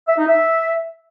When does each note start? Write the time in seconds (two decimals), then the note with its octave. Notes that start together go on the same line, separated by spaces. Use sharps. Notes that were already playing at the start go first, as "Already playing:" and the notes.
0.08 E5
0.18 D#4
0.28 E5